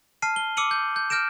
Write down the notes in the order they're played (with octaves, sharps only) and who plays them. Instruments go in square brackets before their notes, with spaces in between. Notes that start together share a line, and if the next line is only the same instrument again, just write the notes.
[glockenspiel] A5 F6 C7 D#7
G7
D6 E6 C#7 D#7 F#7
G6
G6
F6 G6 A#6 D7 E7